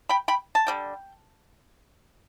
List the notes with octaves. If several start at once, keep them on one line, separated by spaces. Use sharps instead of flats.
G5 B5
G5 B5
A5
D3 G3 G5